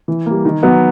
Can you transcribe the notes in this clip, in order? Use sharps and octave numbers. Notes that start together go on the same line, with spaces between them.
E3
G3 A#3
D#3
F#3 B3